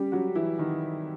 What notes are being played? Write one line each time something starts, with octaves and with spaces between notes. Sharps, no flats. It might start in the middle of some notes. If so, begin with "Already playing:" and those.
Already playing: G3 C#4 G4
F#3 F#4
E3 E4
D#3 D#4